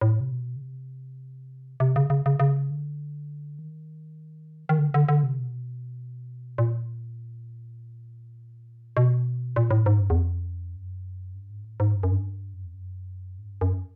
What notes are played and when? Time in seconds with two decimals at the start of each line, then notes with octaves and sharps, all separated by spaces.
0.01 A2
0.20 C3
0.32 B2
0.56 C#3
0.62 C3
1.80 C3
1.96 C#3
2.10 C#3
2.26 C#3
2.40 C#3
2.71 D3
3.59 D#3
4.69 D#3
4.79 D3
4.94 D3
5.09 D3
5.23 C3
5.39 B2
6.58 A#2
8.97 B2
9.56 A#2
9.71 A2
9.86 G#2
10.00 G2
10.10 E2
10.15 F2
10.76 F#2
11.35 G2
11.50 G#2
11.65 A2
11.80 G#2
11.95 G2
12.03 F#2
12.12 G2
12.54 F#2
12.65 F2
12.74 F#2
13.39 G#2
13.50 G2
13.61 F#2